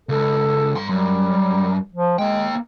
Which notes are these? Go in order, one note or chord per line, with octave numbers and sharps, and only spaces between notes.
C#2 A4
G2 C6
F#2 G3
F3
G#3 A#3 G5